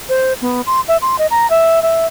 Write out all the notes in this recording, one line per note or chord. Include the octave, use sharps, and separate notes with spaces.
C5
B3
C6
E5
C6
D#5
A#5
E5
E5